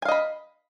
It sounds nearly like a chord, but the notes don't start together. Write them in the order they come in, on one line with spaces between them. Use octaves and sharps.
G#5 F5 D#5 B5